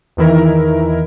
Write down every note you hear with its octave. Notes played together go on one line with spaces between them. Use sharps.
E2 D#3 E3 E4 A#4